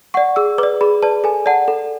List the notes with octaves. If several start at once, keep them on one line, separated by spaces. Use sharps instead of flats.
D5 F#5 C#6
G#4 E6
B4 D5 D6
G#4 B5
B4 D5 A5
A4 G#5
D5 F#5 A5
A4